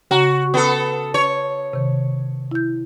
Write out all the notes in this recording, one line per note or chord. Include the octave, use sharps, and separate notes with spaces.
C#3 F#4 F#5 A#5
B3 A4
C#5
C3 D#3
E4 G6